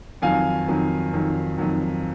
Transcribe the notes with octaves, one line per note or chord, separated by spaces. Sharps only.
F2 D#3 F#3 F5 G#5
F2 D#3 F#3
F2 D#3 F#3
F2 D#3 F#3